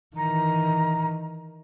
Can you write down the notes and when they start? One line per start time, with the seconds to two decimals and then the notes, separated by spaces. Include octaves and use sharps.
0.16 D#3 E3 A#5